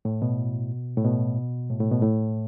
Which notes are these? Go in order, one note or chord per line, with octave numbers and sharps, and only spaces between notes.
A2
B2
A2
B2
A2
A2
B2
A2